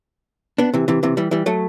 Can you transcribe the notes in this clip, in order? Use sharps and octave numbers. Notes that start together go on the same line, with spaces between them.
B3 D4
C3 E3
C3 E3
C3 E3
E3 G3
E3 G3
F#3 A3